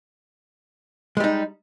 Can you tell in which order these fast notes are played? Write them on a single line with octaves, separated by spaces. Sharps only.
G#3 G3 D#4